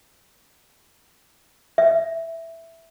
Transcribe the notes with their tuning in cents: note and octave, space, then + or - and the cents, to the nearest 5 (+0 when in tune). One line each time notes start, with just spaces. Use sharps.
E5 +0